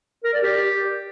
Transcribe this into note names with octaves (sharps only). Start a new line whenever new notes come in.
A#4
D5
G4